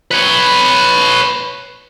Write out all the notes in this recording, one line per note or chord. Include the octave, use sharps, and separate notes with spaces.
B4 C#5